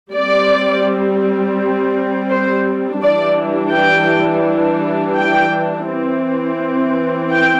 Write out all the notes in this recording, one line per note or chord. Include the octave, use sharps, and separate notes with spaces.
G3 C4 D5
C5
E3 G3 D4 D5
G5
G5
E3 C4
G5